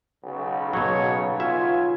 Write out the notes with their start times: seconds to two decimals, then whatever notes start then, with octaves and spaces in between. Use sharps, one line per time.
0.24 B1 C#3
0.73 B2 F#3 C#5
1.40 F4 E5 G#5